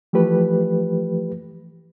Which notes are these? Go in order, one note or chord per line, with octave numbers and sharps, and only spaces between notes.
E3 F3 A3 G4 B4